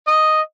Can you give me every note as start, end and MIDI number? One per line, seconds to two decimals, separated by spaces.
0.07 0.41 75